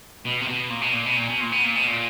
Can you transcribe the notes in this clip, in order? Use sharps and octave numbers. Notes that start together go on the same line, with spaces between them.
B2
C3
B2
A#2
B2
A#2
B2
A#2
B2
A#2
B2
A#2
B2
A#2